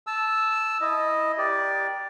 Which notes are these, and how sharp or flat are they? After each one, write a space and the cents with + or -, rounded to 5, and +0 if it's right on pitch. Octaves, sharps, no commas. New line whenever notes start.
A5 -15 E6 +0
E4 -15 D#5 +0
G4 +0 A#4 +30 D5 +0